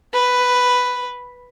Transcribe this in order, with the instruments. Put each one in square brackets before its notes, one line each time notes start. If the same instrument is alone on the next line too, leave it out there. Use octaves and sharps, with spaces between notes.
[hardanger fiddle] B4